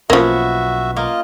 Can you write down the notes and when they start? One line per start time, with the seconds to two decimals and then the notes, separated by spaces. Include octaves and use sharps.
0.10 B1 F3 A#3 B3 C#4 F#4 E5
0.97 A#3 F4 D#5